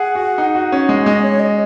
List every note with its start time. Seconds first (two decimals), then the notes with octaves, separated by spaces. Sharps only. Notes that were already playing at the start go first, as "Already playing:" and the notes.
Already playing: G#4 F#5
0.15 F#4
0.38 D#4
0.55 F#4
0.72 C#4
0.89 G#3
1.06 G#3 D#5
1.23 C#5
1.40 D#5